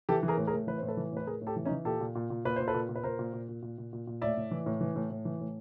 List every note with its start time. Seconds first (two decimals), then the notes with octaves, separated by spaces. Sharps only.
0.09 E3 G4 A4
0.23 E3
0.28 G#4 A#4
0.37 A2
0.47 G#4 A#4
0.53 A2
0.67 E3 B4
0.78 A2 C5
0.88 A4 B4
0.97 E3
1.12 A2 B4
1.27 A2 G#4 A#4
1.41 A2
1.47 G4 A4
1.56 E3
1.65 C#4 D#4
1.71 E3
1.85 A#2 G4 A4
2.01 A#2
2.15 A#2
2.30 A#2
2.45 A#2 B4
2.56 A#2 C5
2.67 A4 B4
2.74 A#2
2.89 A#2
2.96 B4
3.03 A#2 A#4 C5
3.19 A#2
3.33 A#2
3.49 A#2
3.62 A#2
3.78 A#2
3.93 A#2
4.07 A#2
4.22 A2 D5 E5
4.37 A2
4.51 E3
4.66 A2
4.81 E3
4.96 A2
5.10 A2
5.25 E3
5.41 A2